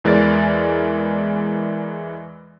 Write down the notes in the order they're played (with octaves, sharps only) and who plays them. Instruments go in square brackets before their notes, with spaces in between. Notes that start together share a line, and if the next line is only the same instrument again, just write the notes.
[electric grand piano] E2 E3 G#3 A#4 D5 A6